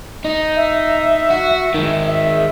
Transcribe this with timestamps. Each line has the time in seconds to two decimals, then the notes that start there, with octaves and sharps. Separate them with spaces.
0.25 D#4
0.56 E5
1.31 F#4
1.74 D#3 G#3
2.06 E5